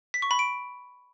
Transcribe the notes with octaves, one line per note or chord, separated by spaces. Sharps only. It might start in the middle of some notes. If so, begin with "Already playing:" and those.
B6
C#6
B5
D7